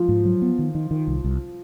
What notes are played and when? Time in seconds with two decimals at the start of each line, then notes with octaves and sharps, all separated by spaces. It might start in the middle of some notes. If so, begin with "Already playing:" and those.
Already playing: F3
0.09 G#2
0.25 F#3
0.42 B3
0.59 D#3
0.75 D#3
0.91 D#3
1.08 C2
1.24 C2